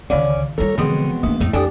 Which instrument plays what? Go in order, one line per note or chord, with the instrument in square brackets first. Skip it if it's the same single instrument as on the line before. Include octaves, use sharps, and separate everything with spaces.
[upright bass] C#2 D3 [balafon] D#3 F5 F#5 [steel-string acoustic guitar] C#4 D5
[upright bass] G3 F4 [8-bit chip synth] A4 [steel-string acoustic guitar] A#4 C#5
[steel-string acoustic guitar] B2 B3 C4 [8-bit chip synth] D3 [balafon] E3 G#3 G#4 [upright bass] F3
[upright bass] D#3 D4 [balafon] A3 [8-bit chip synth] A#3
[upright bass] F2 [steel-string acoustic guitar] A2 D#4
[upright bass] F2 [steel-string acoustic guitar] D4 [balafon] G4 G5 G#5 [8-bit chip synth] A4 D#6